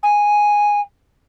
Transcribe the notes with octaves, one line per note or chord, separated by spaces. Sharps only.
G#5